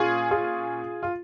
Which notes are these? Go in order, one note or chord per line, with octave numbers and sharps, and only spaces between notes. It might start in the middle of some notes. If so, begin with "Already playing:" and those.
Already playing: A#2 C#4 F4 G#4
F4 G#4
F4